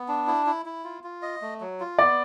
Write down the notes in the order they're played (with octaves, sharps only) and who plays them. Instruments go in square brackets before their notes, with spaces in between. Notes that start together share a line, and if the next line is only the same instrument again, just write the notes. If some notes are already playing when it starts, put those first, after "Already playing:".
Already playing: [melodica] B3
D4
E4
E4
E4
F4
F4
D#5
A3
F#3
F4
[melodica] B3 [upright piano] D5